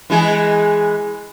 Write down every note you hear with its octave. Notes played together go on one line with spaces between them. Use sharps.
E3 G#3 G#4